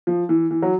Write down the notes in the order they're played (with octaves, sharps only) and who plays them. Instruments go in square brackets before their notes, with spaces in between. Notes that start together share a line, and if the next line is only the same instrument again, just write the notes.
[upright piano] F3
E3
E3
F#3